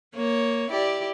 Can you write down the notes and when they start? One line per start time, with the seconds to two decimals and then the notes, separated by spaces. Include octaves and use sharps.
0.15 A#3 C#5
0.70 E4 G4 D5